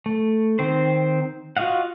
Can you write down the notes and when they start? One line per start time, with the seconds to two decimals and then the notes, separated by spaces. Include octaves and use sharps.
0.06 A3
0.59 D#3 C4 C5
1.57 F4 F#4 D#5 F5 F#5